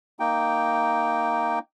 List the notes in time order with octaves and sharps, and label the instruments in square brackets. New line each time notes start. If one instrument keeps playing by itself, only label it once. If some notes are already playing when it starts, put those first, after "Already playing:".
[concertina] A#3 D#4 G5